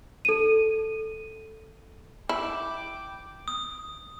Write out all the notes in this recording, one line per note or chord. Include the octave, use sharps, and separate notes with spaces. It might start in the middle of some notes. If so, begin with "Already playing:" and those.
A4 D#7
E4 G5 D6
D#6